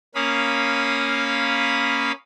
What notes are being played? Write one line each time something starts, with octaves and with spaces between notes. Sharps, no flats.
A#3 C#4 F5 B5 D#6